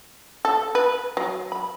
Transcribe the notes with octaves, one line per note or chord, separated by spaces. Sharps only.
A4
B4
F#3
B5